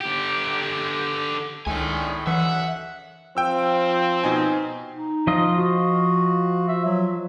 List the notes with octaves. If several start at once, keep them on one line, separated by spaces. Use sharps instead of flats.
D3 G4
C#2 A2 D#3 G#3 A3 D4 G#5
F#2 E3 E5 F#5
F3 C4 G5 E6
B2 D#4 G#5
D#4
F3 F4 D#5
F#4
E5
F#3